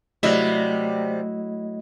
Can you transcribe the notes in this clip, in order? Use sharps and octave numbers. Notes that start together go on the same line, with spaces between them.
C3 F#3 G3 A3 E4 D#5